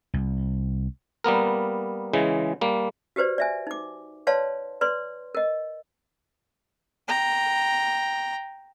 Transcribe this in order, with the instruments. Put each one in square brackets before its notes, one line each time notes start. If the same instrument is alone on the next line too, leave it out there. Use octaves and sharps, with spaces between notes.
[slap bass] C2
[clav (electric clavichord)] G3 A#3 B3 A#4
C#3 E3 G#3
G3 A#3
[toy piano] F#4 G4 B4 C5 D5
D5 E5 G#5
D#4 D6
B4 C#5 D5 F5 A5 C6
B4 D5 C6
A#4 D#5
[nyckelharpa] G5 A#5